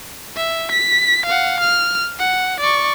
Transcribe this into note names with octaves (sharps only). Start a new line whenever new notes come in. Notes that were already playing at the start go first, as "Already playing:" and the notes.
E5
B6
F5 F#5
F6
F#5
D5 C#6